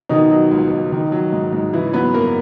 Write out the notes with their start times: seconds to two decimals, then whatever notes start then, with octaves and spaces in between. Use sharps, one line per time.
0.09 B2 D#3 D#4
0.30 F#3
0.51 C#2
0.71 C#2
0.92 D#3
1.12 F#3
1.33 G#2
1.53 G#2
1.73 C#3 E3 E4
1.93 F#3 B3 B4
2.14 F#2 A#3 A#4